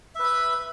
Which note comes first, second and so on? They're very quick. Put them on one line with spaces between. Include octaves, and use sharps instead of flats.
E5 B4 B5